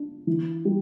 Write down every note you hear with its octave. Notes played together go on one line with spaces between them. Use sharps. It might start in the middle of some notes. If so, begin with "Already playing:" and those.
Already playing: D4
E3
G3